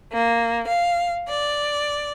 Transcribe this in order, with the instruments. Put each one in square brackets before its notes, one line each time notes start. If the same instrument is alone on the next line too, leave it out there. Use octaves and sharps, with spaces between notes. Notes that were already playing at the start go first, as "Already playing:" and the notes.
[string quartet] A#3
F5
D5